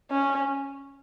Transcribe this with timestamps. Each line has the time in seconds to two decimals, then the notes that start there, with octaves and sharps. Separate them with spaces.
0.11 C#4